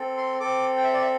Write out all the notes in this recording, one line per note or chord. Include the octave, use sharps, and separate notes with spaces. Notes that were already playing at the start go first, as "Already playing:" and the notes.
Already playing: C4 A4
C6
C4 A4 D6
G5
E5
D5
E5